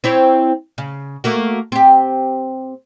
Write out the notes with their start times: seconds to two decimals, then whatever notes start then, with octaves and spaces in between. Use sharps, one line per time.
0.04 C4 E4 C#5
0.78 C#3
1.24 A3 A#3 F#4
1.72 C4 G4